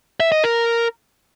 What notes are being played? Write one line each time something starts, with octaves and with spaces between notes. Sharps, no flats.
E5
D#5
A#4